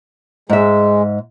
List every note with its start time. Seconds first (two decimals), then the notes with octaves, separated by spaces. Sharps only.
0.49 G#2 G#3 E5